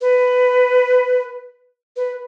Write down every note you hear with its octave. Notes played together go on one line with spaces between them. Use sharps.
B4
B4